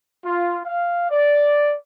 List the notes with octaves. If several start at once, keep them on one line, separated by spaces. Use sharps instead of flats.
F4
F5
D5